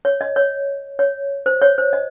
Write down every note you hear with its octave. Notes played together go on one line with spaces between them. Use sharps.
C#5
D#5
C#5
C#5
C5
C#5
C5
D#5